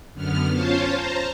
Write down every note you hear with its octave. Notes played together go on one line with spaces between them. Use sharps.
F#2 D3 B3 F6
C#4 F4 C5 C#5 F5 A5
C5 A5 A#5